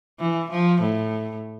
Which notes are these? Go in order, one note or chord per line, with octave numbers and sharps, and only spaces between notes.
E3
F3
A2